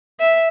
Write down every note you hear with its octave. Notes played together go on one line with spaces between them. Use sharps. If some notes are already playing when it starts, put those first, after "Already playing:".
E5